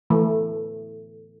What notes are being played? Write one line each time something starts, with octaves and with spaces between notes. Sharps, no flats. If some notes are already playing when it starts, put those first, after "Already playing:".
E3 A3